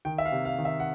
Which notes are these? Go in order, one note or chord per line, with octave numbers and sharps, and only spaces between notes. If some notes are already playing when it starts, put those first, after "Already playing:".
D#3 G5
E5
F5
C3
F5
D#3
E5
F#5